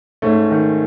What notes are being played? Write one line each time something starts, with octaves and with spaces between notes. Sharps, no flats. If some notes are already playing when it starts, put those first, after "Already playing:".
G#2 A3 C#4
D#3